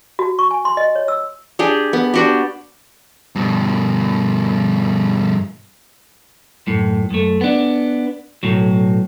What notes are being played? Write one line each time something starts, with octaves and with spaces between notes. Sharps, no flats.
F#4
C#6
G#5
C6
D#5
C#5
E6
D4 G4 G#4
B3
D4 F#4 G4
G2 B2
F#2 A2
F#2 A3
B3 D4
B1 A2 F#3